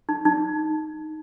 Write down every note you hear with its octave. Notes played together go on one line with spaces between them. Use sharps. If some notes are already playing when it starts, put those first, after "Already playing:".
D#4
D#4